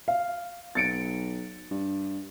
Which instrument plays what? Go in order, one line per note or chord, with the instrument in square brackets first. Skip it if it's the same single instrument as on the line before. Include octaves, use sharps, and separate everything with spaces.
[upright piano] F5
[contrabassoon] B1 [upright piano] A6 C#7 D7
[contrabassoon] G2